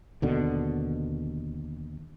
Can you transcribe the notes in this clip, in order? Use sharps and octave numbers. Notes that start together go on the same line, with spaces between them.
D#2 B2 D3